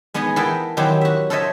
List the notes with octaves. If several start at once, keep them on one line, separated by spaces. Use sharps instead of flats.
G#3 B3 D#4 G#4 D#5
E3 B3 E4 A4 A#4 G5
D#3 F#3 C4 D#4 E4 G4
F#4 E5
A4 A#4 C5 C#5 D#5 E5